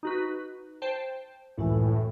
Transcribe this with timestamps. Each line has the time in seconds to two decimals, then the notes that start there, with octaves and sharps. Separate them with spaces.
0.03 D#4 F#4 B4
0.82 C5 G5 A5
1.57 C#2 F#2 A2 E3